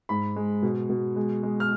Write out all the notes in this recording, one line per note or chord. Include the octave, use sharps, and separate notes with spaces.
G#2 B5
G#3
B2
B2
G#3
G#3
F6